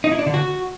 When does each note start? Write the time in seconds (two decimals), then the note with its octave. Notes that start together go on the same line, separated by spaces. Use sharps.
0.04 D#4
0.11 E4
0.19 D4
0.26 D3
0.34 F#4